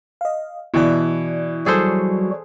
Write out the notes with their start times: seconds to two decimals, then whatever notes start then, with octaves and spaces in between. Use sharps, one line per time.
0.21 D#5 F5
0.74 B2 E3 E4 D5
1.66 F#3 G3 F#4 G#4 A4 C5